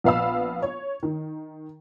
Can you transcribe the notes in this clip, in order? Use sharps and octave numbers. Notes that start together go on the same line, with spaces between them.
A#1 B3 F5 B5 E6
C#5
D#3